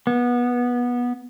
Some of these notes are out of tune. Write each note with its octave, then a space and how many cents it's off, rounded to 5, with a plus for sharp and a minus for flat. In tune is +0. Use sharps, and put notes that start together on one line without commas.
B3 -20